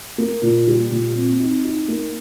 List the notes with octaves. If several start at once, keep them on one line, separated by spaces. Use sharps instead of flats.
A#3
A#2
G3
A#2
C4
D#4
D#4
A#3